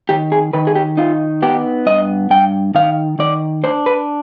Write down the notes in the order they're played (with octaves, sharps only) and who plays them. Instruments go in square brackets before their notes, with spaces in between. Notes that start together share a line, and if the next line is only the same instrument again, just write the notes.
[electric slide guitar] D#3 G4
G#4
D#3 B4
G#4
G4
D#4 F4
B3 G4
G2 D#5
G2 G5
D#3 F5
D#3 D5
D4 C5
B4